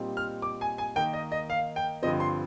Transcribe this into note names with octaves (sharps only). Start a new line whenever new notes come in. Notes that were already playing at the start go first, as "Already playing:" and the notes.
Already playing: A#2 G3 C4 D#4
F6
D6
G#5
G#5
D#3 A#3 D#4 G5
D#5
D#5
F5
G5
G2 D3 F3 C4 D#5
C6